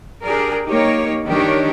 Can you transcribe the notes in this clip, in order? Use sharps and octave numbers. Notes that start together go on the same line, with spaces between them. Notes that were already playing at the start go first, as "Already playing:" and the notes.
D4 G4 G#4 A#4 D5
A#3 D#4 G4 A#4 C#5
D#3 G3 D4 G4 A#4 C#5